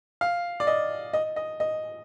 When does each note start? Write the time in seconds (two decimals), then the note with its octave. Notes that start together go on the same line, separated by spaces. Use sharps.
0.21 F5
0.60 D5
0.67 D#5
1.13 D#5
1.36 D#5
1.60 D#5